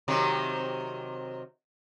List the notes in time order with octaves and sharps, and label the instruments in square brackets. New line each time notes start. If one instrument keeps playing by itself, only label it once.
[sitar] C3 D#3 F#3